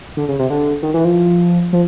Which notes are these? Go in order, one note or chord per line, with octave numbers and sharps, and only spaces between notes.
D3
C#3
C3
D3
D#3
E3
F3
F3